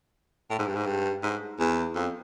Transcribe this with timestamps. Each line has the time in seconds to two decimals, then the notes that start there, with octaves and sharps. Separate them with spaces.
0.50 A2
0.59 G#2
0.67 G2
0.76 G#2
0.86 G2
1.23 G#2
1.60 E2
1.96 F2